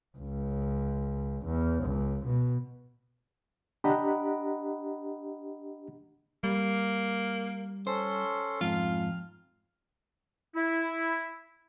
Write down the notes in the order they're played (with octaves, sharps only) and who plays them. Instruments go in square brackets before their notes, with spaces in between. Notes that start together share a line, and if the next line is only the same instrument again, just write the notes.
[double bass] C#2
E2
C#2
B2
[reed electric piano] D4 G4 D#5 F#5 A#5 B5
[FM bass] G3 [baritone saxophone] A#3
[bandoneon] C#4 A4 C6 [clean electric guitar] C5
[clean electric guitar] F2 G#2 [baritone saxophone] F4
[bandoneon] F6
[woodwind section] E4